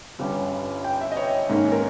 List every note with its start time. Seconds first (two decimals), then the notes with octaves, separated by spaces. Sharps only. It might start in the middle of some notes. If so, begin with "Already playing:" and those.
0.19 G1 G2 G3 C#4
0.84 G5
1.01 E5
1.12 D#5
1.17 C#5
1.50 G#2 D#3 A#3 C#4
1.72 A#4